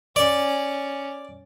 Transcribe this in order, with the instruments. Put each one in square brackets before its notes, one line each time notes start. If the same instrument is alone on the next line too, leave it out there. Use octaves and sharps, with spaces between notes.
[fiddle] C#4 [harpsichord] D5